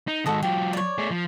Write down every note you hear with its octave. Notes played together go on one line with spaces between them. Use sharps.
D#4
D#3 G#3 F#4 A4 D#5
F#3 F4 G4
C#5 D5
A3 G#4
F3